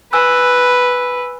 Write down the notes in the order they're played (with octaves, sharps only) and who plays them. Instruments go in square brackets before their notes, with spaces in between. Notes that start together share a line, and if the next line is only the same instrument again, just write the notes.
[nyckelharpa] B4 [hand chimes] G#5 E6 F#6